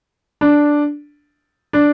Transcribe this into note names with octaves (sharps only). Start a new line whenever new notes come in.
D4
D4